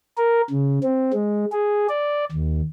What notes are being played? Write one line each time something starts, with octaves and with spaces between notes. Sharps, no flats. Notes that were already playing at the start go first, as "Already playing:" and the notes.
A#4
C#3
C4
G#3
G#4
D5
D#2